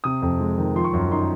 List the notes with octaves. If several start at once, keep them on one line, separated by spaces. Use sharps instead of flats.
C3 D#6
F2
G#3
D#3
F3 C6
C#6
F#2 C6
D#4 C6